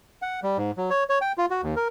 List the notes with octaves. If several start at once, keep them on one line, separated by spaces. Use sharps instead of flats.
F#5
G3
G#2
F#3
C#5
C#5
G5
F4
F#4
D#2
A#4